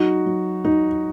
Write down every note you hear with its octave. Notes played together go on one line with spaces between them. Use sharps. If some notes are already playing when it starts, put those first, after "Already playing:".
Already playing: F#3 D#4 F#4
F#3
F#3 D#4